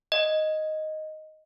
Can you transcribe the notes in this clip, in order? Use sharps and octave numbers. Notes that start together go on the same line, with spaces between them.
D#5